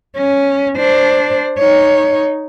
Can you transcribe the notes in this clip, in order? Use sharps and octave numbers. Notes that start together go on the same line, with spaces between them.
C#4
D4 C5
D#4 C#5